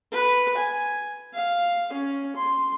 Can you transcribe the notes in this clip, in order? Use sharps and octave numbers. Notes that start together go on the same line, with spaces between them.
B4
G#5
F5
C#4
C6